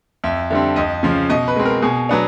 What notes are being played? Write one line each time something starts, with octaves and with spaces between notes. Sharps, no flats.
F2 E5
D3 G3 C4 E5
F2 D#5
C#3 F3
B2 D#5
B4
G#3 C4
A#4
B2 G#4
F#3 B3 D4